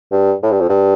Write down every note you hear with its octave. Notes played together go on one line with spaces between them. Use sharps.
G2
A2
G2
F2
G2